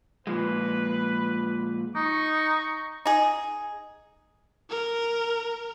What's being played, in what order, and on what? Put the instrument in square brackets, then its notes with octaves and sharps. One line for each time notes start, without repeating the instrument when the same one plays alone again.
[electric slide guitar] A#2 F3 G#3 [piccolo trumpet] B4
[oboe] D#4 [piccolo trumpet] C#6
[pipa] D#4 G#4
[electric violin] A#4